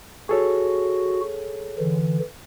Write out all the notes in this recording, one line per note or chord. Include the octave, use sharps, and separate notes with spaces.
F#4 G#4 A4 C#5
D3 E3